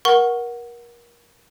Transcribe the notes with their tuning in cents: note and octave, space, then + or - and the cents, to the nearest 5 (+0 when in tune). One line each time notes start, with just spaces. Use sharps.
A#4 +30 F#5 +0 C#6 +0